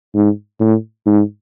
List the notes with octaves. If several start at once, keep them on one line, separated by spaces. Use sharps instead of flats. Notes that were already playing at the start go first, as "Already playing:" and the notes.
G#2
A2
G#2